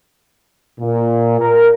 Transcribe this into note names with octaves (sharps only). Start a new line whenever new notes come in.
A#2
A#4